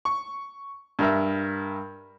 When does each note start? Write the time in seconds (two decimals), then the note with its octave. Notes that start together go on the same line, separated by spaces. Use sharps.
0.05 C#6
0.99 G2 A#4 E5